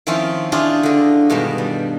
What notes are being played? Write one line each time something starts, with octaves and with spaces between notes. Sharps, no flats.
D#3 F3 C4 C#4 E4 F4
C#4 D4 E4 F4 G4 G#4
D3 D#5
G2 B2 D#3 G#3
G3